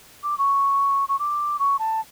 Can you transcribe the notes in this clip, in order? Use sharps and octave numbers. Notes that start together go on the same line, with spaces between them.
D6
C#6
C#6
D6
C#6
A5